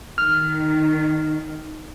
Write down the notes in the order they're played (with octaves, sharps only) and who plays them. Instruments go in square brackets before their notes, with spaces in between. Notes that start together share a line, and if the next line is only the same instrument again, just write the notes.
[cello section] D#3 [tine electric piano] F6